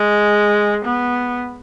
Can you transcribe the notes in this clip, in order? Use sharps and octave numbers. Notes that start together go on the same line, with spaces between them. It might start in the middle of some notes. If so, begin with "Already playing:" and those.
Already playing: G#3
B3